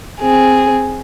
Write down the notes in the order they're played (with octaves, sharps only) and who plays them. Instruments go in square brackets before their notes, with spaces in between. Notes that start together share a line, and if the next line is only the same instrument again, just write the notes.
[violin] C4 G#4